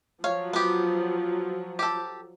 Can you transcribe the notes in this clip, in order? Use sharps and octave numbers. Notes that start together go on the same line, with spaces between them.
F3 F#3 C#5 F5
B3 G4
G4 A4